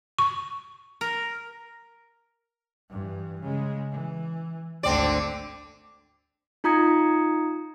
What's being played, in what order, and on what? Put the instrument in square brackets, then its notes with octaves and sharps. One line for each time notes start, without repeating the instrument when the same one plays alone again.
[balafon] C#6
[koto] A#4
[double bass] G2 E3
C#3 G#3
E3
[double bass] G#1 D2 [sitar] D3 C4 D5
[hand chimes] D#4 F4 A#5 D#6 G#6 C#7